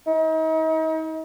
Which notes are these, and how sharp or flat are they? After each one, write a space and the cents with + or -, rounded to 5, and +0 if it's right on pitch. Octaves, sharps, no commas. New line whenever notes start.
D#4 +40